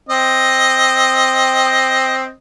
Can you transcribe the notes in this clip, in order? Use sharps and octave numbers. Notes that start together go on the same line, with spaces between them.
C4 D#5